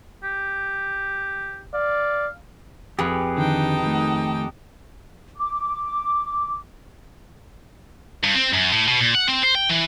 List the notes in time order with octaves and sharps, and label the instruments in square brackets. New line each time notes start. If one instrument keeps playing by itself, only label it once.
[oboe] G4
[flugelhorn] D5 [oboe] F5
[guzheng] F2 [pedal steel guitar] G4 G#4 B4
[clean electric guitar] D3 D#3 [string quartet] D#4 G5 A5
[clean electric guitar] D#3 A3
[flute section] D6
[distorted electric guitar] G2
C4
F#2
A2
B2
A#2
F#5
C4
C5
G5
E3